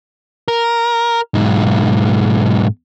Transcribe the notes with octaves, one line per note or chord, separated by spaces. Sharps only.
A#4
B1 G#2